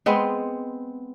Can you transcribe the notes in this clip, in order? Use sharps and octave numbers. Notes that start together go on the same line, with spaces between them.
G#3 B3 C4